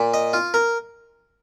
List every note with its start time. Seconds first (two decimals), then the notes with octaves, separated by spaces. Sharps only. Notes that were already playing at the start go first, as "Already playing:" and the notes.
Already playing: A#2
0.14 D#5
0.33 F4
0.54 A#4